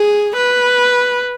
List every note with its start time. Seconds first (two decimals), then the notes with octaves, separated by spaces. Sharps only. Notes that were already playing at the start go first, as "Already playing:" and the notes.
Already playing: G#4
0.37 B4